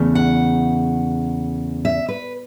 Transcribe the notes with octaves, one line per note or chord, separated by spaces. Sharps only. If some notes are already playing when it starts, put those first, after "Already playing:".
Already playing: E2 C#3 A3
F#5
E5
B4